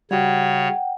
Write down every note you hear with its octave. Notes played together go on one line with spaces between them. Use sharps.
C#3 G3 F#4 C#5 F#5 G5